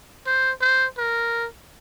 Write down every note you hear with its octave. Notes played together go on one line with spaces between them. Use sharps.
C5
C5
A#4